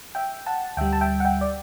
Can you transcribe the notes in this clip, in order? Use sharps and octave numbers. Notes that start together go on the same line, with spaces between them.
E5 G5
F#5 A5
D2 D3 G3 E5 G5
A5
E5 G5
F#5
E5 G5
D5